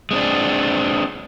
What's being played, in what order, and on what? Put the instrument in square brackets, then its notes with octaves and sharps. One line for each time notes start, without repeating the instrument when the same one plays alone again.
[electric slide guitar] G#3 C4 D4